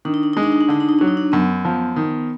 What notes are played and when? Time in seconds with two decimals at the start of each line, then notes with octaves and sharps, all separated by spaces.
0.05 D#3 D4
0.14 D#4
0.23 D4
0.33 G#3 D#4
0.43 D4
0.52 D#4
0.61 D4
0.68 D3 D#4
0.80 D4
0.89 D#4
0.99 F#3 D4
1.07 D#4
1.17 D4
1.32 F#2 B3
1.65 F3
1.96 D#3